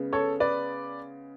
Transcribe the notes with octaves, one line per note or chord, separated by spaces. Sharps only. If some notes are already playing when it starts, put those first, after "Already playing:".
Already playing: C#3 G#3 B3
A4 C#5
B4 D5